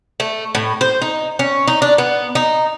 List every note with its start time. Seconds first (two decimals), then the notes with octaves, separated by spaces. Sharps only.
0.20 A3
0.55 A2
0.81 C5
1.02 D#4
1.39 C#4
1.68 D#4
1.82 D4
1.98 B3
2.35 D#4